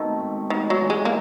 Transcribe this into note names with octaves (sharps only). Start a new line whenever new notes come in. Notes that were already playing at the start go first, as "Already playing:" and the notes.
Already playing: B2 D#3 A3 C4 D#4
G#2
D#3 B3
F#3
E3
G#3
A#3